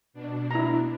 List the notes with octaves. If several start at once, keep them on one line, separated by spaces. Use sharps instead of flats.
B2 D4
E4 A#5